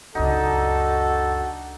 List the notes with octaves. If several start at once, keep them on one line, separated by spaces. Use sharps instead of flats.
C#2 F#2 D4 D#4 F#4 A4